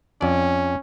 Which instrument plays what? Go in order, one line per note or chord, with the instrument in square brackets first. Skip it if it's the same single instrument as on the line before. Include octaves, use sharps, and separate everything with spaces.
[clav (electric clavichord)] F2 D5 [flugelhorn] C#4